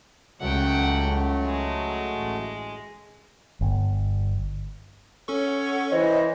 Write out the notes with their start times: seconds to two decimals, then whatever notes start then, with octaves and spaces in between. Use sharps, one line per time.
0.41 C#2 C#3 F#3 A3 F#5 G5
1.44 G#3
2.11 A1
3.61 G1
5.28 C#4 A4 C#5 F#5 C#6
5.91 E3 C5 D#5